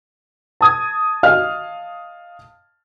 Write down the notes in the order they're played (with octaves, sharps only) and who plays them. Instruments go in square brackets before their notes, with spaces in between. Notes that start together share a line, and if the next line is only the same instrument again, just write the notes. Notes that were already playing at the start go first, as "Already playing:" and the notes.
[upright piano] A5 D#6 G#6
[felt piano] D#5 F5 F6